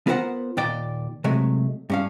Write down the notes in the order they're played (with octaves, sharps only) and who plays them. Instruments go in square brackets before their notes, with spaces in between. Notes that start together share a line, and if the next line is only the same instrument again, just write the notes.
[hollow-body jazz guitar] B3 F4 A#4 C5 F5 F#5
D#2 A#2 D5 G5
C3 F#3 G#3 A3
G2 C#4 F5